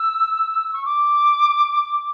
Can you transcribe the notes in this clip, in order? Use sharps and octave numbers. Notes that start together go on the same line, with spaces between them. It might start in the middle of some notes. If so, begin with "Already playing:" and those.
Already playing: E6
C#6
D6